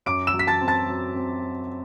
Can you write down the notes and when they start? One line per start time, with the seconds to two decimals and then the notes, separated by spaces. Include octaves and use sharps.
0.06 F#2 D6 D7
0.27 E6 E7
0.33 F#3
0.39 B6
0.47 A5 A6
0.61 C4
0.68 A5 A6
0.89 F#3
1.16 C4